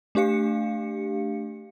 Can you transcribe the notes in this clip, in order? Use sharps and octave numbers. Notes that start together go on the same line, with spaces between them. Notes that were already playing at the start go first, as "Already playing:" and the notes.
A3 D4 G4 F5 C#7